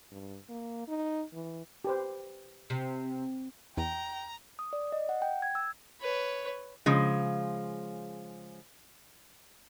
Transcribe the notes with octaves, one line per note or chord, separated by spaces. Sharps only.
G2
A#3
D#4
E3
G4 B4 C5
C3
E2 G5 A#5
D#6
D5
D#5
F#5
G5
G#6
E6
B4 C#5
C#3 F3 G#3